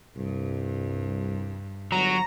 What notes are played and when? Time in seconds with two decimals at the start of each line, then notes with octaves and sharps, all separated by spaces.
0.16 C2 G2
1.92 G1 F#3 A#5